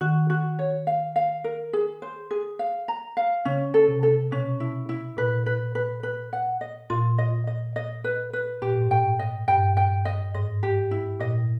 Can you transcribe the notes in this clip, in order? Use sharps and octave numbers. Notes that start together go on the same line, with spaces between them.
D#3 F#4
F#4
C#5
F5
F5
A#4
G#4
C5
G#4
F5
A#5
F5
C#3 C#4
A4
C3
A4
B2 C#4
E4
E4
A#2 B4
B4
B4
B4
F#5
D#5
A#2 F4
D#5
D#5
D#5
B4
B4
A#2 G4
A2
G#2
A2 G5
D#5
G2 G5
G5
D#5
G#2 D#5
G4
E4
A#2 D#5